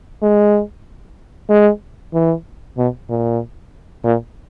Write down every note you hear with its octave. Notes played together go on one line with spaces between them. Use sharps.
G#3
G#3
E3
B2
A#2
A#2